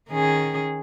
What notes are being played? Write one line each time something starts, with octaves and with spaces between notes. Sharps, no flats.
D#3 C#4 G#4